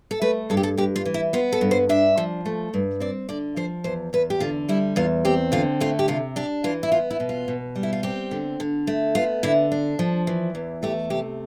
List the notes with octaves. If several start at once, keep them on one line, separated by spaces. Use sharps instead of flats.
A4
A3 B4
G2 A4
G4
A4
G2 G4
F4
E3
E4
B3 F4
A4
G2
C5
D4 E5
F3
A3
G2
C4 D5
D3 D5
F3 C5
E2 C5
E2 B4
G4
D3 F4
G3 E4
E2 F4
C4 G4
D3 F4
A3 F4
G4
C3 F4
D4 G4
E3 F4
E4
B3 F4
E4
B2
F4
B2
G3
E4
F4
C4 G4
D3
D3
A3
B3 F4
D3 E4
D4
F3
E3
E2
A3 G4
C3 G4